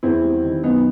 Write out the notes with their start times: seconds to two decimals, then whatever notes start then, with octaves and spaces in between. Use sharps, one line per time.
0.03 E2 C4 E4
0.24 G3
0.44 D#3
0.63 F#2 B3 D#4